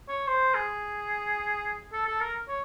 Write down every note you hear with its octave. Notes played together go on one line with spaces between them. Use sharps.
C#5
C5
G#4
A4
A4
A#4
C#5